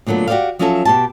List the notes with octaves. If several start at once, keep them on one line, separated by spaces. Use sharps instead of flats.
A#2 D3 F#3 A3 B3
F#4 G4 A4 C5 D5 F5
F3 F#3 C#4 F#4 A4 E5
B2 G4 A5